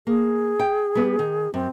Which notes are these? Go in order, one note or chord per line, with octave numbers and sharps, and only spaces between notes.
A#3 G#4
G5
G3 B3
D#3
F#2 C4